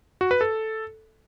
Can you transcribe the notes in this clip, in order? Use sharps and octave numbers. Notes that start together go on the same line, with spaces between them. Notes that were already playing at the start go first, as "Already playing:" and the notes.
F#4
B4
A4